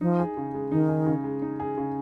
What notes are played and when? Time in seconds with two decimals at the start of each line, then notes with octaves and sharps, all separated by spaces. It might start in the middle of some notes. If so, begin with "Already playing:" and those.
0.01 F3 D#4
0.19 G#4
0.37 C#3
0.54 G#3
0.71 D#3 D#4
0.89 G#4
1.06 C#3
1.24 G#3
1.42 D#4
1.60 G#4
1.78 C#3